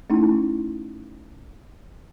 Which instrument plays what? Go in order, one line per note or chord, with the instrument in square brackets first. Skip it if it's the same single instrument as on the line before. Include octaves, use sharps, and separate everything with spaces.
[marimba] A3 C#4 D#4 E4